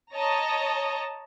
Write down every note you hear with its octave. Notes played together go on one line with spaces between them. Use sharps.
C#5 D#5 A5 A#5